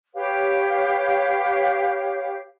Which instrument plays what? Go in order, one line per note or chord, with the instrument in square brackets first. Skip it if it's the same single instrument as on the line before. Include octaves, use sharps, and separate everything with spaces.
[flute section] G4 B4 C#5 F5